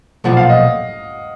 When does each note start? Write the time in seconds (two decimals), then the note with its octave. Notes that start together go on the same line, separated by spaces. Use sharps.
0.24 B1 A#2 F3 F#5
0.37 F5
0.49 D#5